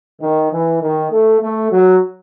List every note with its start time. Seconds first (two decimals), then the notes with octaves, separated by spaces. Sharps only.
0.21 D#3
0.51 E3
0.81 D#3
1.11 A3
1.41 A3
1.71 F#3